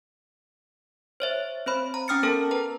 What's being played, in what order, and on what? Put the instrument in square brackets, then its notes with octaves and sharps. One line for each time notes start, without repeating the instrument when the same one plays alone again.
[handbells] C5 C#5 E5
C4 C5 B5
A#5
C#4 G5 D#6 F6 A6 C#7
B3 A4 A#4 A5
B4 A#5